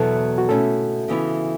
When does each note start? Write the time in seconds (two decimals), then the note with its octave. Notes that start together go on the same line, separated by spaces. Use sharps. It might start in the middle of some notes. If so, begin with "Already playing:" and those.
Already playing: E2 B2 F#3 B3 E4 A4
0.38 F#4
0.49 B2 A3 C#4 E4 A4
1.08 C#3 E3 B3 E4